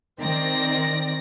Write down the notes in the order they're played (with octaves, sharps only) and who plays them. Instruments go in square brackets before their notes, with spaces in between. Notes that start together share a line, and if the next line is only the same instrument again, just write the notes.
[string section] D#3 C4 D5 A#6